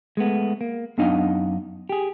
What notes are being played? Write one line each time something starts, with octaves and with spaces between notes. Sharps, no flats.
G#3 A3 B3
A#3
F#2 B3 D4 D#4 D#5 F5
G4 G#4